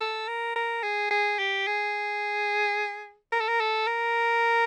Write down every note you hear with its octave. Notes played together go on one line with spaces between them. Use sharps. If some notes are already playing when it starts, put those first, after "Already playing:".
A4
A#4
A#4
G#4
G#4
G4
G#4
A#4
A4
A#4
A4
A#4